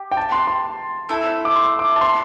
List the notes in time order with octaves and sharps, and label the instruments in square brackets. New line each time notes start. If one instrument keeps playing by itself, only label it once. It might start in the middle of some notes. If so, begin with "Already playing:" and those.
Already playing: [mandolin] G4
[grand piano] G5
A5
C6
C6
[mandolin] A3 E4 A4
[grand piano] D6
C6
D6
A5
C6